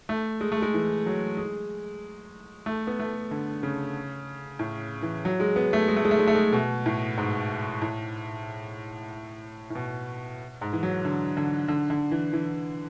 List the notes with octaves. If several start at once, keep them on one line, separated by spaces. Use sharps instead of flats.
A3
G#3
A3
G#3
E3
F#3
G#3
A3
B3
A3
D3
C#3
A2
E3
F#3
G#3
B3
A3
G#3
A3
G#3
A3
G#3
A3
G#3
B2
A2
G#2
A2
A2
B2
G#2
E3
F#3
D3
D3
D3
D3
E3
E3